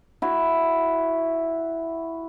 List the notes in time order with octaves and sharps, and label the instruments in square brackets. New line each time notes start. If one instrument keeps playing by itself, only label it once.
[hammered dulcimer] E4 F#4